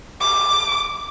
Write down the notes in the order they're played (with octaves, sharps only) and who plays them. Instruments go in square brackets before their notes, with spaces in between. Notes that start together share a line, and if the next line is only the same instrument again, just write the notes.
[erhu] D6